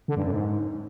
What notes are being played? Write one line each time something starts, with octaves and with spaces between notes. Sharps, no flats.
D3
G2
F#2
G#2